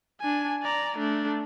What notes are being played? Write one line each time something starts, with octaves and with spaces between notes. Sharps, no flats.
D4 G#5
D5 A#5
A3 D4